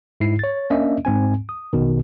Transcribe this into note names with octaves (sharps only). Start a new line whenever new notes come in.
G#2 E4 C7
C#5 A6
A#3 C#4 D4 D#5 E5
G#2 C4 G#5
D#6
A#1 B2 D#3